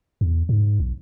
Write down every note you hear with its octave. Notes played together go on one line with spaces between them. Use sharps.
E2
G#2
B1